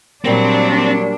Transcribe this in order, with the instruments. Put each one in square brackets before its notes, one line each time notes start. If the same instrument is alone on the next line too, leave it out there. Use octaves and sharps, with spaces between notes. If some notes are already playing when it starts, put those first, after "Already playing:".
[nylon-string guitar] A#2 G3 A#3 [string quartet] F#3 [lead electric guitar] C4 [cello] D4